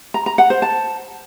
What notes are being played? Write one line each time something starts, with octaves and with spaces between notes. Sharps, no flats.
A#5
A#5
F#5
C5
A5